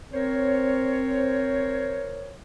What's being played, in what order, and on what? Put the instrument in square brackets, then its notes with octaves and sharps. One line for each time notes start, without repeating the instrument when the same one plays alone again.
[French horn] C4 [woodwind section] A#4 C5 C#5